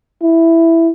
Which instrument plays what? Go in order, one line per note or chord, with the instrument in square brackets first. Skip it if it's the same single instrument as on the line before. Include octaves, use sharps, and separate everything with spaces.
[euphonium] E4